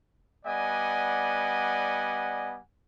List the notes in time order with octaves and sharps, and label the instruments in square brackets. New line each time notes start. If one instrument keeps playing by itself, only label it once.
[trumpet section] G3 B3 D5 D#5 F#5 G#5